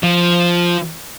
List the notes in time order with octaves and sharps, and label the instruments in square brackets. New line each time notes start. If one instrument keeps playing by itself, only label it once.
[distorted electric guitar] F3